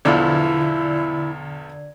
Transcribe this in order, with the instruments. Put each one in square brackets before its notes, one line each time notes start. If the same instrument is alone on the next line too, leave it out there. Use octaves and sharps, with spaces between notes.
[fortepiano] B1 E2 F3 [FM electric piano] D3 D5 G#6 [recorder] E4